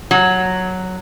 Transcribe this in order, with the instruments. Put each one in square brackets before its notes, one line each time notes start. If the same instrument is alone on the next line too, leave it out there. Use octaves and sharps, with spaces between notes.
[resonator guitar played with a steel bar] F#3